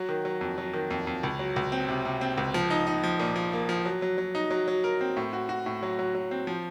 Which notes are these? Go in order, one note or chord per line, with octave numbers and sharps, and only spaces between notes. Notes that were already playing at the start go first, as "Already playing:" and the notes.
Already playing: F#3 F#4
D#3
F#3
F2
F#3
D#3
F2
F2
C#2
F#3
C#2
C4
C3
C3
C4
C#2
F3
D#4
D#4
F3
A#2
F3
A#3
F3
F#3
F#3
F#3
D#4
F#3
F#3
A#4
C4
A2
F#4
F#4
A2
F#3
F#3
F#3
C4
F3